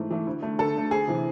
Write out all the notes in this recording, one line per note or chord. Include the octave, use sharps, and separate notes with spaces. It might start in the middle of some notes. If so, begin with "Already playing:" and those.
Already playing: G#2 E3 A3
E3 A3
D2
D3 A3
D2 A4
D3 A3
D2 G#4
C3 E3